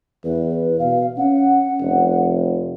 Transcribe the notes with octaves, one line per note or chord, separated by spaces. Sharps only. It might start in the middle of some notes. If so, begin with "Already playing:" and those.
E2 B4
B2 F5
C#4 F#5
F1